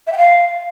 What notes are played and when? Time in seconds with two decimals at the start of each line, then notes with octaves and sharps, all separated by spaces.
0.07 E5
0.12 G5
0.18 F5